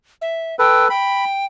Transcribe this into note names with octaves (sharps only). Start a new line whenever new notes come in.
E5
A4 B4 G5
G5 B5